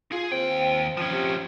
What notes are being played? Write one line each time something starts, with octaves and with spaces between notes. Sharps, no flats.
F4 G#4
D#2 C4 G5
F3 C#4
C3